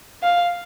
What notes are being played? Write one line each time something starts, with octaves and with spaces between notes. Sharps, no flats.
F5